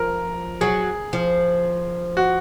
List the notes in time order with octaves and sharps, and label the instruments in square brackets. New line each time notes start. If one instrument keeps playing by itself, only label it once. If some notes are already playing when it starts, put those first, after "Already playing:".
Already playing: [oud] F3 [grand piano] A#4
[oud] F#3 [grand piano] G#4
[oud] F3
[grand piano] F#4